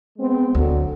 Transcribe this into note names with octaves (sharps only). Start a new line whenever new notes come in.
G#3 B3 C4
D2 D3 F#3